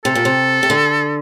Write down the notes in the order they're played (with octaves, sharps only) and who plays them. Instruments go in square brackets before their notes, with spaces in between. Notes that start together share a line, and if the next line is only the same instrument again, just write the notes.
[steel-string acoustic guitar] C3 [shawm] A4
[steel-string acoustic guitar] A#2
C3
C3
D3